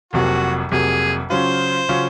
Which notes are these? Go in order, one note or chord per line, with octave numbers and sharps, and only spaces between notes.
F1 F2 C3 F#3 A#3 F#4
F1 F2 C3 F#3 A#3 G#4
C#3 F#3 C#4 F4 C5
C#3 F#3 C#4 F4